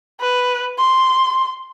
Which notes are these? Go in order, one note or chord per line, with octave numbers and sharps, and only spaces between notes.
B4
C6